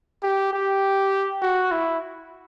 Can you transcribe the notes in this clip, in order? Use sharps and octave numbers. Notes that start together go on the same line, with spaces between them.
G4
G4
F#4
E4